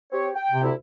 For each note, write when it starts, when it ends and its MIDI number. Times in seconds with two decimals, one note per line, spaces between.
0.12 0.30 60
0.12 0.30 67
0.12 0.30 73
0.36 0.63 79
0.51 0.71 48
0.63 0.74 38
0.63 0.74 64